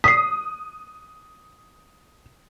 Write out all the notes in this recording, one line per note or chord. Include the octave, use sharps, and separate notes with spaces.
D#6 B6 C7